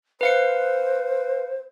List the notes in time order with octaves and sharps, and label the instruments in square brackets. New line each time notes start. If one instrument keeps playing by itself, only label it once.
[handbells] B4 F5 C#7 [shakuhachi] C5